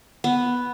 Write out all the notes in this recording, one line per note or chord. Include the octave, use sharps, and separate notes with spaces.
B3